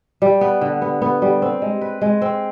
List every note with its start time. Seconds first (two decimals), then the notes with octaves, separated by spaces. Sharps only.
0.22 G3
0.41 B3
0.61 D3
0.82 B3
1.02 B3
1.22 G3
1.42 C4
1.62 G#3
1.81 B4
2.01 G#3
2.22 C4